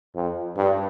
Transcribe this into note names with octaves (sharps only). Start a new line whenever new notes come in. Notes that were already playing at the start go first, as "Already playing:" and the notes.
F2
G2